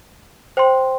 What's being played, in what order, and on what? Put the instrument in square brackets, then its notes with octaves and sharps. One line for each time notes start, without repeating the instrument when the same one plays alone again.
[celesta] C5 G5 C6